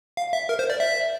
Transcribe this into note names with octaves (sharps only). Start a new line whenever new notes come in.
F5
E5
A#4
C5
D5
E5